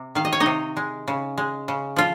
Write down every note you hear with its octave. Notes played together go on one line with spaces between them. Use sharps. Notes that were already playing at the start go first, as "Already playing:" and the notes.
Already playing: C3
D#3 F5
D#5
C#5
D#4 D#5
C3
G#3
C#3
G#3
C#3
F3 F4